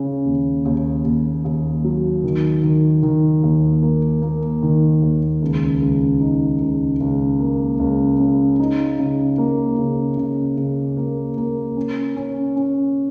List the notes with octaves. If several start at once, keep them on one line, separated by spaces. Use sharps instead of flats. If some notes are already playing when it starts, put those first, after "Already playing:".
Already playing: C#3 C#4
D#2
D#2
D#2
D#2
F#3
D#3
D#3
D#3
D#2
A#3
A#3
D#3
D#2
C#2
C#2
D#4
C#2
C#2
A#3
C#2
C#3
D#4
C#3
A#3
C#3
C#3
C#3
A#3
A#3
C#4
C#4
C#4